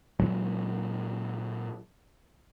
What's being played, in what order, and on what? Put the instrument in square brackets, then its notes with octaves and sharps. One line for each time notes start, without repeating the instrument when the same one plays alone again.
[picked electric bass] A#2 F#3 G#3